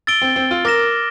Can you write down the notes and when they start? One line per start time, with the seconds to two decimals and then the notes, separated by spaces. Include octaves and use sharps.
0.07 E6 A6 D7 G7
0.22 C4
0.36 C4
0.51 F4
0.65 A#4 D6 F6 A#6 E7